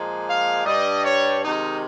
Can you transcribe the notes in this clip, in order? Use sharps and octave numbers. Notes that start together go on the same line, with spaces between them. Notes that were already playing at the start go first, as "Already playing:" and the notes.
Already playing: A#2 F3 G#3
F5
G2 G3 D#5
C#5
C3 D#3 G#3 D#4